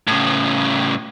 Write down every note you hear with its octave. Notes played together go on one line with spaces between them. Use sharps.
A2 C#3